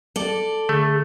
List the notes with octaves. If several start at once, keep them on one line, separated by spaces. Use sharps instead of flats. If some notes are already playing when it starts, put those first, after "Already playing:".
A4 D5
D3 A3 G#4